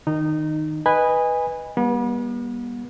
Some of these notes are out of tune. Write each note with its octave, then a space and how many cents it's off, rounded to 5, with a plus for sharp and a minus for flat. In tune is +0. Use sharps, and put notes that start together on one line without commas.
D#3 +0 D#4 -20
B4 +0 D#5 +0 G#5 -20
G3 +15 B3 -40